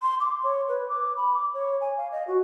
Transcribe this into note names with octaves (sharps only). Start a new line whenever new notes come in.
C6
D6
C#5
B4
D6
B5
D6
C#5
G#5
F5
D#5
F#4